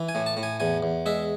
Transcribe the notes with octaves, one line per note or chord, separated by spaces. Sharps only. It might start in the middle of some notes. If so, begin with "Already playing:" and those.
Already playing: E3
G#5
A2
A5
A2
G#5
E2 G#5
E2
G#3 E5